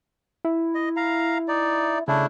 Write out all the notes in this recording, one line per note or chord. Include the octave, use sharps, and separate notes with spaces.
E4
D#5
F5 A#5
D#4 D5
C#3 A3 D4 E4